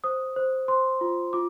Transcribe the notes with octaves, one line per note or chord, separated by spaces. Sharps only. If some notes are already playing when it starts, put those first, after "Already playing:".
C5 D#6
C5
C5 C6
F4
F4 D6